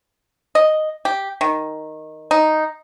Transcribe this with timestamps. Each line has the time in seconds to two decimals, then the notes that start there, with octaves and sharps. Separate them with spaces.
0.55 D#5
1.05 G4
1.41 D#3
2.31 D#4